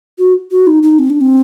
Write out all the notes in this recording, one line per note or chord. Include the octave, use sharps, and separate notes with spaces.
F#4
F#4
D#4
D#4
C4
D4
C4